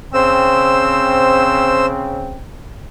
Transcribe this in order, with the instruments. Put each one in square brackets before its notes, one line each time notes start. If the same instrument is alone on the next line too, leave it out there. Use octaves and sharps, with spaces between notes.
[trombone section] C#3 C4 [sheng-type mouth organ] C5 E6